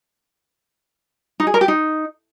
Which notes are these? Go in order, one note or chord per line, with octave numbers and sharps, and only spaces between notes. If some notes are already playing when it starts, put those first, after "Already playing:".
D#4
G#4
A#4
G4
D#4